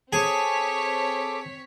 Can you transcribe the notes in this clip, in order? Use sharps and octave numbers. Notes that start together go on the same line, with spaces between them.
C4 G#4 A4 C#5 A5 D6 B6